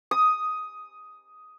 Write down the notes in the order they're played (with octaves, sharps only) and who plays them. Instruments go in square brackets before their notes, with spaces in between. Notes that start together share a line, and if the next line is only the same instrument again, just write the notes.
[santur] D#6